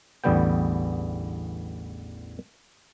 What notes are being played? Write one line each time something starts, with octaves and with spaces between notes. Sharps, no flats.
A1 E2 D3 G3 B3 G5